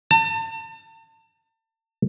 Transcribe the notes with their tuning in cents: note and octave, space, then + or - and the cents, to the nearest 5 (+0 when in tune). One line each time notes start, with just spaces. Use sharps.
A5 +40